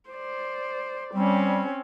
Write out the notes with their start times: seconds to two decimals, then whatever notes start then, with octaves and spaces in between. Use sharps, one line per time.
0.10 C5 D5
1.14 G3 C4 C#4